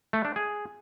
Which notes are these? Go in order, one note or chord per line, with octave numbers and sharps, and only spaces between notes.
A3
D4
G#4